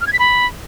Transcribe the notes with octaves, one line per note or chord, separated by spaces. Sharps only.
F6
G#6
B6
B5